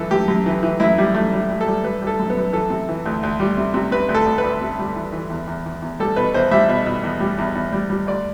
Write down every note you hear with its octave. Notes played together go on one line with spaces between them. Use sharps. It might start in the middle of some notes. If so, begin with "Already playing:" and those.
Already playing: F#2 E3 A4
F#2 G4
F#2
E3
E3
F#2 E4
G3
F#2 A3
G3
G3
A4
G3
G3 B4
G3
A4
F#2
B3
F#2
E3 A4
C3
E3
D2
D2
G3
C3
C3
C3 B4
D2
A4
D2
B4
D2
C3
G3
E3
E3
E2
E2
E2
E2
G3 A4
B2 B4
E2 C5
G3 E5
B2
B2
E2
G3
E2
E2
G3
G3
D2 D5